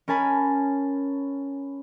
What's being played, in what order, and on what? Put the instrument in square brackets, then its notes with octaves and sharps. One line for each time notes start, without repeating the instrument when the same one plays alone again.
[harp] C#4 A#4 G#5 A5 B5